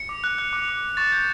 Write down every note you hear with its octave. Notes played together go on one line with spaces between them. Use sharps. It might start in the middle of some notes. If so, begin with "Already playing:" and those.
Already playing: C#7
D6
F#6
F#6
D6
D6
D6
C#6 A6
G6